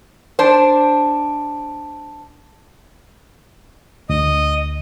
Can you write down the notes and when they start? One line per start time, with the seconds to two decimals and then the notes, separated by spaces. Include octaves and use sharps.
0.39 D4 C5
4.10 D2 D#5 D#6